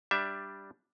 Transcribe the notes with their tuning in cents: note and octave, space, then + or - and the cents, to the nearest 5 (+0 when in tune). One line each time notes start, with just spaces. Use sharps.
G3 +0 D4 +0 E5 +10